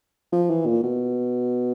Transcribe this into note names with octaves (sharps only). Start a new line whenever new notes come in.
F3
E3
A#2
B2